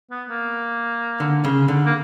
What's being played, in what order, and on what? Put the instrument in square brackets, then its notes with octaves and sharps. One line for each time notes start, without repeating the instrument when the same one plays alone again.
[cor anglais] B3
A#3
[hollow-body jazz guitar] D3
C#3
D3
[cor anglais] A#3